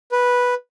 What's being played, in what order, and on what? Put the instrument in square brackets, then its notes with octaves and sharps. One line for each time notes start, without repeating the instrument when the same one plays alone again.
[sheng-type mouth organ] B4